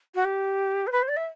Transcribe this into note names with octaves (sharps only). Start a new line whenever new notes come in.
F#4
G4
C5
B4
C5
D5
E5